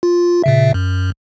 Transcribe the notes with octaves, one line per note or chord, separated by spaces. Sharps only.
F4
A#2 C#3 E5
F#2